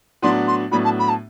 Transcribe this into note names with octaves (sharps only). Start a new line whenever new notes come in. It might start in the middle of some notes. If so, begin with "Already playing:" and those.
A2 F#3 B3 D4 F#4 C6
C6
A2 F#3 B3 D4 F#4 B5
A5
B5
A5